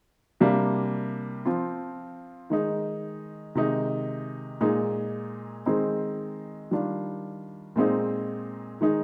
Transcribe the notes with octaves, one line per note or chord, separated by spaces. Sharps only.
C3 G3 A#3 D4
F3 C4 F4
D#3 G#3 D#4
C3 D#3 G#3 D#4
A#2 G#3 D#4
D#3 G#3 C4 D#4
D#3 G3 D4 F4
A#2 G#3 C4 D#4
D#3 G#3 D#4